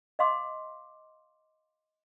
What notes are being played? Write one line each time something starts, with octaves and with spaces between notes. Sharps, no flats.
D#5 F5 C6 D6